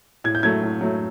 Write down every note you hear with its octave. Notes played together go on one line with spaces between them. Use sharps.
A2 G#6
G6
F#3 A3 G#6
A2
F#3 A3